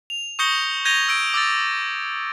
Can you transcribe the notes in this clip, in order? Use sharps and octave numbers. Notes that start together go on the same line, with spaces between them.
F7
C#6 D#6 G6 A#6 C#7 G7
G6 G#6 A#6 D#7 F7 G7
E6 D7
D6 E6 A6